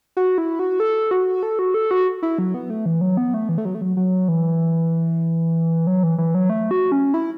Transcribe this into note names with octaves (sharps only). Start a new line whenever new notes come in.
F#4
E4
F#4
A4
F#4
A4
F#4
A4
F#4
E4
F#3
B3
A3
E3
F#3
B3
A3
E3
A3
F#3
A3
F#3
F#3
E3
F#3
E3
E3
F#3
A3
F#4
C#4
E4